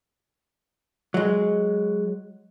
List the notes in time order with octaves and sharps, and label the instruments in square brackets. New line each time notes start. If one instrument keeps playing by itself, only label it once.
[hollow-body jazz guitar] F#3 G#3